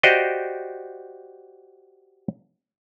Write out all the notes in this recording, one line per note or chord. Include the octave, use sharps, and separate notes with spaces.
F#4 G4 C5 D5 D#5 F5